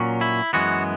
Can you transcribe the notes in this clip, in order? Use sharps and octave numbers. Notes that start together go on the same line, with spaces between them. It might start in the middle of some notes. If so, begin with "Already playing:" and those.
Already playing: A#2 F#3 C#4
E4
F#2 E3 G#3 B3 F#4